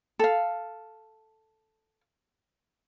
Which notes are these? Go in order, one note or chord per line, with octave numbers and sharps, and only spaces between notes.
A4 F5